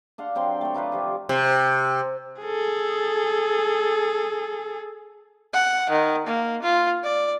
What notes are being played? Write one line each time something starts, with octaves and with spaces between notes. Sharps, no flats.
D4 F5 F#5 C6
F#3 C4 G5 C6
A3 C#5
D#4 F4 B4 D5
C3 F3 G4
C3
G#4 A4
F#5
D#3
A#3
F4
D5